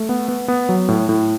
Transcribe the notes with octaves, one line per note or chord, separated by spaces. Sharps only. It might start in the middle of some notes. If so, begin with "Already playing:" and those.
Already playing: A3
B3
B3
B3
F#3
A2
A2